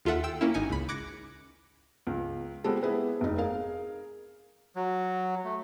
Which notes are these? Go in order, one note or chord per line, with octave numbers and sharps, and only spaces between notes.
D#2 F4 A4 E5 F#5
G5 E6
A#3 C#4 E4
G#1 D#4 G#5 C#7
C#2 B5
D6 F#6 G#6 A#6 C#7
C#2
G#3 B3 C4 F4 G4 A4
B3 E4 G#4 B4
F1 D#4
G#4 A#4 F5
F#3
A3